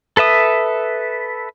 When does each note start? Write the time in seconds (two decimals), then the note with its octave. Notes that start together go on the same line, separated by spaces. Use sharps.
0.17 A4 B4 E5 D#6